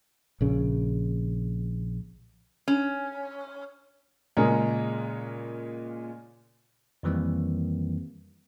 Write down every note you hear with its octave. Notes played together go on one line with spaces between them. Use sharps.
A#1 C#3
C#4
A#2 C#3 G#3 C#4 A#4
F2 D#3 E3 G3 A#3 C4